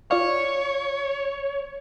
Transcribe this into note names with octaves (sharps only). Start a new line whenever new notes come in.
F4 C#5 D5 F5